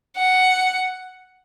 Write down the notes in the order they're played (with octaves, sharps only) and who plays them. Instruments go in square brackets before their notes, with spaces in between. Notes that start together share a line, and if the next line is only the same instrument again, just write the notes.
[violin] F#5